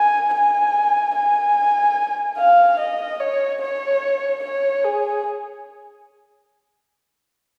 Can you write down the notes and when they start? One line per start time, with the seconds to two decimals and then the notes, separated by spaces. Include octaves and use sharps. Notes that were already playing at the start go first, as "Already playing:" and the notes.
Already playing: G#5
0.33 G#5
1.16 G#5
2.38 F5
2.80 D#5
3.20 C#5
3.61 C#5
4.43 C#5
4.85 G#4